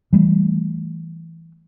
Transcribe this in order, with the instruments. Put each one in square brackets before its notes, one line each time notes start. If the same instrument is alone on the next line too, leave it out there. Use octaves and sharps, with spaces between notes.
[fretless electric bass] E3 G3 A3